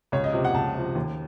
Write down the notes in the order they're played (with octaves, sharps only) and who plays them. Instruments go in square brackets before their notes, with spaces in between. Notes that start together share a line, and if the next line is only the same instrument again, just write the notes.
[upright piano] C#2 C#5
D#5
C3 F3
F#5
C#2 A5
C3 F3
D#2